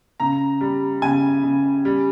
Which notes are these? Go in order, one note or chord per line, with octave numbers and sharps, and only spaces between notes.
C#3 A#5
G3
C#3 G#5
C#3
G3